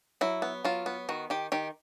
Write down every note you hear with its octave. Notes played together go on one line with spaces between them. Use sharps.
F#3 E4
B3
F#3 F4
B3
D#3 F#4
D#3 G4
D#3 G4